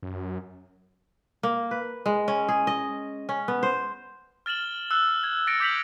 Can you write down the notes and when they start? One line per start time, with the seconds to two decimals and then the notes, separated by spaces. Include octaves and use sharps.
0.02 F#2
1.43 A#3
1.71 B4
2.06 G#3
2.28 C#4
2.49 G#4
2.67 D#5
3.29 C#4
3.48 B3
3.63 C5
4.46 F6 A6 E7 F#7 G7
4.91 E6 F#6
5.24 G#6
5.47 D#6 E6 A6 A#6 C#7 D7
5.60 D6 G6 B6 F7 F#7